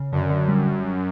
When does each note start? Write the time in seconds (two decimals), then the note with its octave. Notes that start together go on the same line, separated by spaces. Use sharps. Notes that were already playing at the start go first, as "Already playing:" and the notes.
Already playing: C#3
0.12 F#2 D3
0.30 D3
0.48 G3